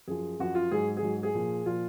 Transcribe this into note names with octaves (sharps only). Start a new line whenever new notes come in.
F#2 F3 G#4
F#2 F3 F#4
F4
G#2 F#3 G#4
G#4
G#2 F#3
G#4
A#2 F3
A#2 F3 F4